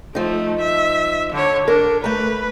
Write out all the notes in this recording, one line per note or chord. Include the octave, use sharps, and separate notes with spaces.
F3 A3 D#4
E5
D3 C#5
D4 A#4
A3 B4 A#5